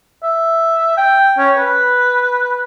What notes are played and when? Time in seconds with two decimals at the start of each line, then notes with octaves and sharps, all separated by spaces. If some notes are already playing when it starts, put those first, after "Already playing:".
0.23 E5
0.97 G5
1.38 C#4
1.57 B4